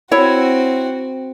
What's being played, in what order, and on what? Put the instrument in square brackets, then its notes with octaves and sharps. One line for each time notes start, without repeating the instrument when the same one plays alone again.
[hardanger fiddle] C4 F#4 [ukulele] E4 C#5